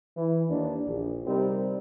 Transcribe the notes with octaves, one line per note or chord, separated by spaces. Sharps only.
E3
D#2 D4
A#1
C3 G3 C4 D#4 A#4